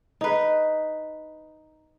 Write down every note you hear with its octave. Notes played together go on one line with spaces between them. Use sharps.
D#4 B4